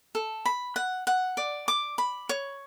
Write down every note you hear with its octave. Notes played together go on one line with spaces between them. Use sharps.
A4
B5
F#5
F#5
D5
D6
B5
C#5